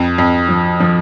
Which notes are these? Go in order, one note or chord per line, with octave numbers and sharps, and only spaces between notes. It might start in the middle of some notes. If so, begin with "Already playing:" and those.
Already playing: F2
F2
F3
F3